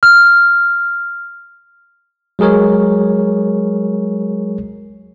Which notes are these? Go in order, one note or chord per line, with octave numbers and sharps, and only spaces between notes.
F6
F#3 G#3 G#4 A#4 C#5